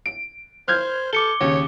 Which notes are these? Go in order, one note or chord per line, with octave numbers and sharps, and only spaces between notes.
D7
C5 F6 G6 G#6
A4 D6 C#7 G7
D#2 C#3 C#5